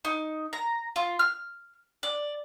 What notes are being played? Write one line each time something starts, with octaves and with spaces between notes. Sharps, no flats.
D#4
A#5
F4
F6
D5